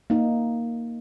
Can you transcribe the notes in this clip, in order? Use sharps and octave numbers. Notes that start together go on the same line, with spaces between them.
A#3 D#4